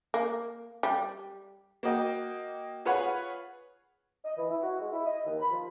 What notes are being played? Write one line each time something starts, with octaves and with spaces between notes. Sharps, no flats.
A#3
G3
A#3 F#4 D#5 G5
F4 G#4 B4 C#5 F#5
D#5
E3
E4
F#4
G#3
E4
D#5
D#2
B5
F3